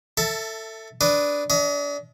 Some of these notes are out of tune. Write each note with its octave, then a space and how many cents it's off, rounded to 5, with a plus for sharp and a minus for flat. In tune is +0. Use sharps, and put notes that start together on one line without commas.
A4 +20 E5 +0 A5 +0
D4 -10 B4 +0 D#5 +0
D4 -35 D#5 +30